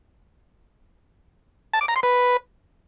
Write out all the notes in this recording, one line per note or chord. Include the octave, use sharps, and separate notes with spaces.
A5
D6
A#5
C6
B4